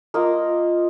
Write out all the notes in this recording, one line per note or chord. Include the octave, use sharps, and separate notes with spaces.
A#3 F4 A#4 D#5